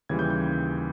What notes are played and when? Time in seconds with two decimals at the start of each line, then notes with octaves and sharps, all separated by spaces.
0.09 D#2 C#3 E3 G3 G#6
0.19 G6
0.30 G6